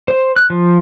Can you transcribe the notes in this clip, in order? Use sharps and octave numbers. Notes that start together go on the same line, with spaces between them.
C5
F#6
F3